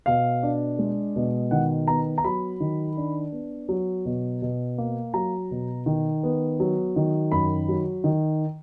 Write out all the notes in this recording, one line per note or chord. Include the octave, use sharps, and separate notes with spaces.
B2 F5
D4
G#3
B2
D#3 F#5
B3 A#5
A#5
F#3 B5
D#3
D4
B3
F#3
B2
B2
A#3
F#3 A#5
B2
D#3
B3
F#3
D#3
F#2 B5
F#3
D#3